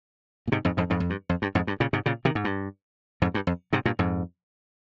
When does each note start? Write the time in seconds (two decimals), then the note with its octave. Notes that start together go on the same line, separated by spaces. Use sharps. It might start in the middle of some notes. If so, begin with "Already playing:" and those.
0.47 A#2
0.52 G#2 C3
0.65 F2 G#2
0.77 F2 G#2
0.90 F2 G#2
1.00 F2
1.10 G2
1.29 F2
1.42 G2
1.55 F2 G#2
1.67 G2
1.80 A#2 C#3
1.93 G#2 C3
2.06 A#2 C#3
2.25 C3 D#3
2.35 G#2
2.44 G2
3.22 F2 G#2
3.34 G2
3.47 F2
3.73 G#2 C3
3.85 G2 A#2
3.99 F2 G#2